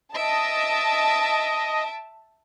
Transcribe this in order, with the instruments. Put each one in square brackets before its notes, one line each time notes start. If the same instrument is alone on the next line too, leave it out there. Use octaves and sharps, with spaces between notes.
[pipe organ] D#5 [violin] E5 D7 [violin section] A5